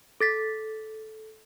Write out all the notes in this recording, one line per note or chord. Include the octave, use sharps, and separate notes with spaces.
A4 A6 B6